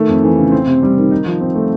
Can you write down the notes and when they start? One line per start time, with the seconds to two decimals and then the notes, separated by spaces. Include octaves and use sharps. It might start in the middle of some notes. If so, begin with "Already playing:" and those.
Already playing: D#3 A3
0.09 F2
0.23 E3
0.38 C#3
0.52 C4
0.67 C3
0.82 G3
0.97 D#3
1.11 D#4
1.26 F3
1.41 C4
1.55 A3